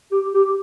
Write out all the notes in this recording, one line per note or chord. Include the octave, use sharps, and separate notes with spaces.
G4
G4